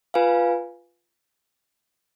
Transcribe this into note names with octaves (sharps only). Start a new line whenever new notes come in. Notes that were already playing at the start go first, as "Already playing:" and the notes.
F4 B4 F5 G#5